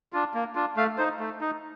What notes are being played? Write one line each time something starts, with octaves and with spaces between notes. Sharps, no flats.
D4 F4
A#3
D4 F4
A3 F5
D#4 C5
A3
D#4